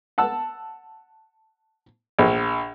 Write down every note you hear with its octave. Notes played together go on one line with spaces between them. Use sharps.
F#5 A5 E6
A#1